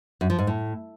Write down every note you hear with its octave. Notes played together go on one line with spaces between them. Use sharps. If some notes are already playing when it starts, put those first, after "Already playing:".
F#2
F3
G#2
A2